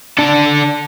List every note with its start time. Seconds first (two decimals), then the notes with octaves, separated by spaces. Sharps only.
0.18 D4 A4